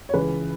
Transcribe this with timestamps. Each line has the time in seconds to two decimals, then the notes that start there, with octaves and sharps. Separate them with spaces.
0.09 C#5
0.14 C#2 C#3 E3 B4